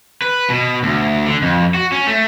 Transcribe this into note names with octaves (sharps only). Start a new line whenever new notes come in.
B4
B2
D2
D3
F2
F#4
C#4
A3